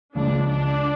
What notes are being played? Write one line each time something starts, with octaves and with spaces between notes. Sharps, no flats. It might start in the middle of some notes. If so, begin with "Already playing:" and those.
C#2 C#3 F3 G#3 D4
D4